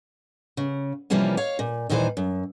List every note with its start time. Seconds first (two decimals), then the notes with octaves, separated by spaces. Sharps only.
0.57 C#3
1.10 C3 E3 F3 G3 A#3 C#4
1.37 C#5 F5
1.59 A#2
1.89 D#2 A#2 D#3 E3 A4 C5
2.17 F#2